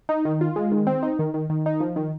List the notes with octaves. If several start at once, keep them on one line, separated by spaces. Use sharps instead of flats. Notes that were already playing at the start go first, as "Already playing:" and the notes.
D#4
D#3
F4
G#3
D#3
C4
D#4
D#3
D#3
D#3
D#4
F3
D#3